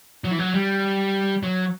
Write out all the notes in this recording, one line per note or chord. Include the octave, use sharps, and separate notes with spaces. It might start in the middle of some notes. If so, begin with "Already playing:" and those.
F#3
E3
F#3
G3
F#3